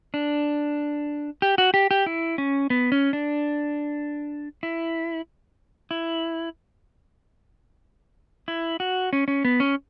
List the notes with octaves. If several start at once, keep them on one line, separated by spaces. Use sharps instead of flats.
D4
G4
F#4
G4
G4
E4
C#4
B3
C#4
D4
E4
E4
E4
F#4
C#4
C#4
B3
C#4